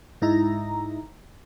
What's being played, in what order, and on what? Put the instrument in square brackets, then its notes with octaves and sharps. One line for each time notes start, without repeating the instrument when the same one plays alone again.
[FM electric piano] G#2 D#4 E4 A#5